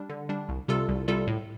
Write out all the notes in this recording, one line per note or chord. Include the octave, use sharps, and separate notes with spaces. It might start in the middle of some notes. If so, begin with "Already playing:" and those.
Already playing: G3 D4
D3
G3 D4
C2
C3 G3 F4 A4
C2
C3 G3 F4 A4
A2